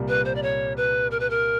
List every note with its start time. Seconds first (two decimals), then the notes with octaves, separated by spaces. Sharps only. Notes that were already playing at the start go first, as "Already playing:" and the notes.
Already playing: C2 A#2 G3 A#3
0.08 B4
0.25 C5
0.35 D5
0.43 C#5
0.77 B4
1.11 A#4
1.20 B4
1.30 A#4